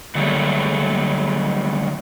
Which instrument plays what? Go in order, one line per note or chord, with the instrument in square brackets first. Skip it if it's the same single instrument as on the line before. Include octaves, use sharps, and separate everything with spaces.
[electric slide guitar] D3 F#3 G3 A3 A#3